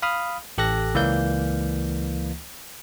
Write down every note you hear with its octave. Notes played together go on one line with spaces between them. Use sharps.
F5 B5 D#6 F6
A1 G4 A4 F#6 A#6
C#2 E3 A#3 D5 F5 G6